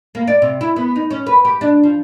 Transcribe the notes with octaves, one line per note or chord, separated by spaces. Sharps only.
A#3
D5
C3
E4
B3
D#4
C#4
B4
G4
D4
F3